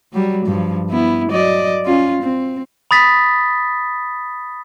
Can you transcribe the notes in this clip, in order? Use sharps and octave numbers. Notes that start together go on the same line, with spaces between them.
F#3 G3
G2 F3
B3 E4
F#3 D5 D#5
C#4 F4
C4
B5 D#6 A6 B6